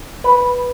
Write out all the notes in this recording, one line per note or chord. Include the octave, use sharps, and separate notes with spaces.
B4